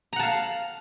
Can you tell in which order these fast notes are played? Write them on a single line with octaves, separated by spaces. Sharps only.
A#5 F#5 A5 F5